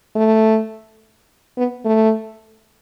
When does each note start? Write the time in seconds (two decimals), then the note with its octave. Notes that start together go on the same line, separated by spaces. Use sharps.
0.16 A3
1.57 B3
1.85 A3